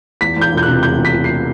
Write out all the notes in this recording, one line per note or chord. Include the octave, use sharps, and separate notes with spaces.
E2 B6
E2 G6
E1 G6
F#6
C3
E2 G6
E2
B6
E2
C7